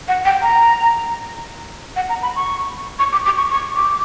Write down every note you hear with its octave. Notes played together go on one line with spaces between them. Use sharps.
F#5
G5
A#5
F#5
A#5
B5
C#6
C#6
D6
D6
C#6
C#6
D6